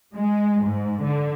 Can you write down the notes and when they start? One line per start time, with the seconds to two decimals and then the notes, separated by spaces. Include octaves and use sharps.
0.14 G#3
0.63 G#2
1.03 D3